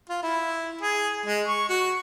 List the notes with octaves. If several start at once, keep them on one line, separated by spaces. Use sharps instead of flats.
F4
E4
G#4
G#3
C#6
F#4